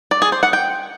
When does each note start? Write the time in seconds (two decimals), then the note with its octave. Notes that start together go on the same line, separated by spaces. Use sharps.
0.11 D5
0.22 G#4
0.32 C5
0.43 F#5
0.53 G5